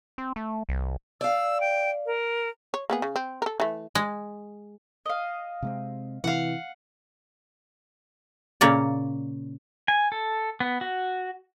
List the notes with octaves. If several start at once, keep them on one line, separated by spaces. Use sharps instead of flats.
C4
A3
C2
D5 F5 E6
G5
A#4
C#5
A#3 B3 G#4
C#3
C4
A4 A#4
E3 A3
G#3
D#5 F5
C3 G#3 C4
C3 E3 F5 F#5
A#2 C#3 A#3 C#5 D5
G#5
A4
B3
F#4